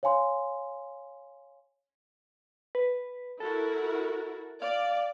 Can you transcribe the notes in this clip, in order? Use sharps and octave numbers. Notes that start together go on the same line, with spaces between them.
C#5 F5 G#5 C6
B4
E4 F#4 A4 A#4
D5 F5